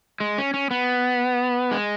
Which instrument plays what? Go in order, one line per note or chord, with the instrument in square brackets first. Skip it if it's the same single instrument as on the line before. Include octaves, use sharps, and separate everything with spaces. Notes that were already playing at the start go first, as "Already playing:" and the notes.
[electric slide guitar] G#3
C#4
C#4
B3
G#3